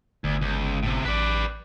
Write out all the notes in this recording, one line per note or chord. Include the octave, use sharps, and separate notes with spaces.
G1 D2
C#2
A2 C3
A1 B4 D5